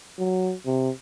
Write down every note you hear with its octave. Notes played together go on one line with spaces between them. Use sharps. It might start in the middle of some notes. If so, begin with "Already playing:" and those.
F#3
C3